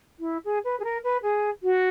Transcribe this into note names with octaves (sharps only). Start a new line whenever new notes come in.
E4
G#4
B4
G#4
A#4
B4
G#4
F#4